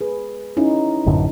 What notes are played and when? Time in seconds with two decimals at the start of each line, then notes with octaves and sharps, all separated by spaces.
0.01 G#4 B4
0.57 C#4 D#4 E4
1.06 A1 F#2 D3